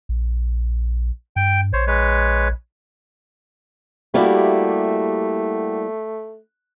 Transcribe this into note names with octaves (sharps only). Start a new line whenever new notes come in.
A#1
G2 G5
A#1 C5 C#5
G#3 B4 C#5
G3 A3 A#3 E4 F#4 G4